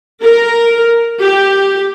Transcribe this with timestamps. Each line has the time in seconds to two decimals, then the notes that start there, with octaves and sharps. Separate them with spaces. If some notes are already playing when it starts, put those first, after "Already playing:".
0.23 A#4
1.20 G4